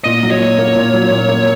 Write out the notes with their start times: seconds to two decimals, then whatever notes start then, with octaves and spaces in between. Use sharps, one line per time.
0.04 A#2 D#5
0.23 F#3
0.31 C#5
0.40 A#2
0.58 A#3
0.76 A#2
0.94 F#3
1.11 A#2
1.29 A#3